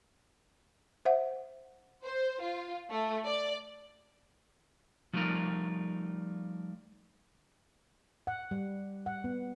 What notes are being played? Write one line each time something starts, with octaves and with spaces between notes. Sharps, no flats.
C5 E5 F#5
C5
F4
A3
D5
F3 G3 A3 D#4 F4 A#4
F#5
G3
F#5
B3